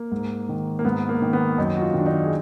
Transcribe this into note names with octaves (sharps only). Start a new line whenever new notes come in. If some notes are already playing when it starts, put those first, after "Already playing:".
Already playing: A#3
G#2
D#3
A#3
G#2 B3
A#3
D#3
B3
F#2 D#4
F#4
F4
D#3 D4
D#4
G#4